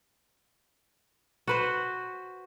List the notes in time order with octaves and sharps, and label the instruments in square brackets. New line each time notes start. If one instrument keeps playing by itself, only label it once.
[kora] F#4 B4 C5